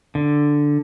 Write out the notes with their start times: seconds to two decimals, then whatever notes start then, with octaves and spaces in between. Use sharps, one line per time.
0.15 D3